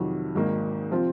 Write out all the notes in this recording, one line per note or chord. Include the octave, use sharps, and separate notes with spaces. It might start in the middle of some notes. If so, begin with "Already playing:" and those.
Already playing: F2 C3 D#3 F#3
G#1 G#2 D#3 A#3 D#4
C3 F3 C4 F4